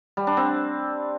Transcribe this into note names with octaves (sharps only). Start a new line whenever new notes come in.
G3
D4
C4